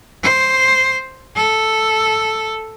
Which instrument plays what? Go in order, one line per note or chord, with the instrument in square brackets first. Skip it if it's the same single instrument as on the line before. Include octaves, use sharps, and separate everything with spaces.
[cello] C5
A4